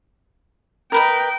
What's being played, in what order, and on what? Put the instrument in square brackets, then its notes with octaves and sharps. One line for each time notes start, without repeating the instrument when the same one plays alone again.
[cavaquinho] A#4 B4 D#5 [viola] G5